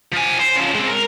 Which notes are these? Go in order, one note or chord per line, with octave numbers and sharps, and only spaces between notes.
F3 G#5
C5
C#3 F3
G#3 C4
A#4